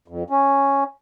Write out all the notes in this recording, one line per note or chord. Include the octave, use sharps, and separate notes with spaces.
F2
C#4